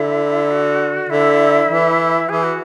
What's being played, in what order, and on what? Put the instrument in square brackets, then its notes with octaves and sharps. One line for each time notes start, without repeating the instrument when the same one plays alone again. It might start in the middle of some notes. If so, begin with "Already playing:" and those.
Already playing: [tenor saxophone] D3 [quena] E4
[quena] F#4
[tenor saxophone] D3 [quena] E4
[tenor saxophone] E3
[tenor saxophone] E3 [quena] G#4
[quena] F#4